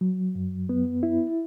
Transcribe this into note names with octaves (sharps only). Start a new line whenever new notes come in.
F#3
F#2
B3
E4